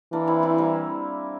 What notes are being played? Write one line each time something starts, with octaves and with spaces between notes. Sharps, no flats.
E3 A#3 D4
C4 E4
C4 E4
G3 A#3